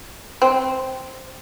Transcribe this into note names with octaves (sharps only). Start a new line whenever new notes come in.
C4